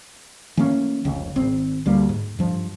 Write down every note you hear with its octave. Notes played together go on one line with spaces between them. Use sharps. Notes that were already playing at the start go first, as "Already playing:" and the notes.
E3 A3 A#3 C#4
F1 C#2
G#1 C4
D2 G3 A#3
G#2
G2 F3